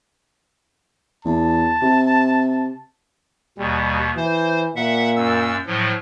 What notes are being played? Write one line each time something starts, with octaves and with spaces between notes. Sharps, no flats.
E2 A5
C3
D#2 B2 G3
E3 C5
A#2 E5 F#5
F#2 E6
A2 F3 F#3